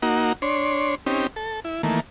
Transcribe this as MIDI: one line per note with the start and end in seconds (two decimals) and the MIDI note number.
0.02 0.33 58
0.02 0.33 63
0.02 0.33 66
0.42 0.95 62
0.42 0.95 73
0.42 0.95 84
1.06 1.27 60
1.06 1.27 61
1.06 1.27 63
1.06 1.27 67
1.36 1.60 69
1.65 1.82 64
1.83 2.00 51
1.83 2.00 52
1.83 2.00 57
1.83 2.00 58